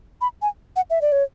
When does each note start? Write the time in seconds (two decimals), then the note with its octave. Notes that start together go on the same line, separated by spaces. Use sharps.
0.21 B5
0.42 G#5
0.76 F#5
0.90 E5
1.01 D5
1.12 C#5